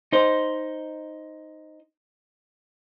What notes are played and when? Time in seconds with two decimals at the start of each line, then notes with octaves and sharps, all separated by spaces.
0.13 D#4 C5